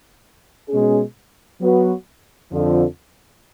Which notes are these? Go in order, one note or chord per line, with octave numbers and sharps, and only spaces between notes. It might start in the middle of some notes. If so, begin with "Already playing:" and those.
B2 G#3 C#4 G#4
F#3 B3 F#4 B4
F2 D3 F3